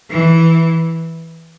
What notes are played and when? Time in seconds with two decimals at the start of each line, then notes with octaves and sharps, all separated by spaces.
0.10 E3